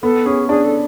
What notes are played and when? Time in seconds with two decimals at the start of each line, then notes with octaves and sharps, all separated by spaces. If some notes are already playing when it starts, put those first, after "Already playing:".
0.03 B3 A4
0.26 C#4 G#4
0.49 D4 G#4
0.65 A4